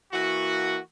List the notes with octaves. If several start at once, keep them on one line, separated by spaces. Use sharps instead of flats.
E3 A#3 F#4